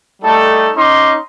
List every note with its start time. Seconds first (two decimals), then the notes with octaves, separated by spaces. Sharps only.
0.22 G3 A3 D#4 A4
0.75 C#4 D#4 C6 D6